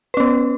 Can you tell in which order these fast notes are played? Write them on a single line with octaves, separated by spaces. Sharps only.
B4 C#4 B3